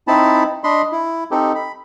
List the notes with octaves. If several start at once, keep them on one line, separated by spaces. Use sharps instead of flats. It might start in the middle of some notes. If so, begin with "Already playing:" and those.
C4 D#4 E4 A5 B5
D4 D#5 B5 C6
E4
C4 D#4 G4 A4
B5